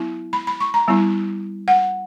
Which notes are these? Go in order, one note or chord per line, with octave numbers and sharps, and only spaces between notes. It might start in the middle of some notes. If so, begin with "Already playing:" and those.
Already playing: F#3 B3 E4
B5
B5
C#6
A#5
G3 B3 E4
F#5